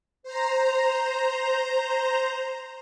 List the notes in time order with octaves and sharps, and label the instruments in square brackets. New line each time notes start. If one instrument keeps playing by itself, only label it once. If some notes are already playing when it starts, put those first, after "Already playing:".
[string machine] C5 A#5